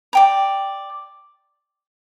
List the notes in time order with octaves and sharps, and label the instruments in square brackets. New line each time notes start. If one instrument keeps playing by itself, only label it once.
[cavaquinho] D5 G5 A#5